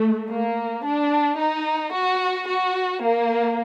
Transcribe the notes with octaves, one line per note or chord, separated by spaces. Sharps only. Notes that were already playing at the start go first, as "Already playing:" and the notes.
Already playing: A3
A#3
D4
D#4
F#4
F#4
A#3